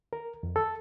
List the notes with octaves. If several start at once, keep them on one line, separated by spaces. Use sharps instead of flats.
A#4
F2
A4